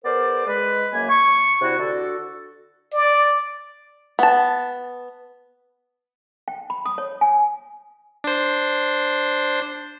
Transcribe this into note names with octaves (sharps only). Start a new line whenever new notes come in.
B3 G#4 A#4 C5 D5
G#3 B4
F#2 A#3 G#5
C#6
C3 D4 E4 F#4
D3 D4 F#4 A4
D5
B3 A5
G5
B5
D#6
C#5
G#5
D4 C5